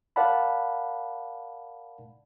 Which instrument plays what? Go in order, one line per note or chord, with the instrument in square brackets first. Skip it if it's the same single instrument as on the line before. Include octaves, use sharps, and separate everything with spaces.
[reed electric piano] A#4 D5 F5 F#5 A5 B5